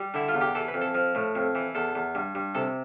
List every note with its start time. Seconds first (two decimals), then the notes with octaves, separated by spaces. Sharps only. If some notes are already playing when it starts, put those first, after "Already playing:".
Already playing: G3
0.14 D3 E4
0.28 F4
0.34 E2
0.41 G4
0.55 E3 A4
0.68 B4
0.74 F2
0.81 A4
0.95 F3
1.15 A2
1.35 F2
1.55 E3
1.75 E2 A4
1.95 E2
2.15 G2
2.35 G2
2.55 C3 A4